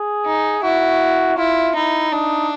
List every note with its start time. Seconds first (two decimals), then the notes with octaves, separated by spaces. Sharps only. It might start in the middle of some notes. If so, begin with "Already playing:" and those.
Already playing: G#4
0.26 D#4
0.63 E4 F#4
1.37 E4 F4
1.75 D#4 E4
2.12 D4 D#4